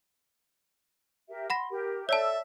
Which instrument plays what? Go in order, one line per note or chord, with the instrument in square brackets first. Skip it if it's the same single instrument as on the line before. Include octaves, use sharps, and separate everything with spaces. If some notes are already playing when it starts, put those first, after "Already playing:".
[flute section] G4 A#4 E5
[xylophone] F#5 B5 A#6 [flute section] C6
[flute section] G4 A#4
[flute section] A4 E6 [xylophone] C#5 D5 A5 [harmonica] E5